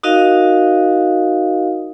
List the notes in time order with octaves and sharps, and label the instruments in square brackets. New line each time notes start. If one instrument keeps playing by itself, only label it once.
[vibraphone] D#4 F#4 A#4 D#5 F5